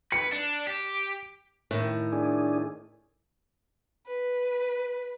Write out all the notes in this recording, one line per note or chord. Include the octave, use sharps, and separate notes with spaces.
B4 C#7
D4
G4
A2 D#3
D4 G#4
B4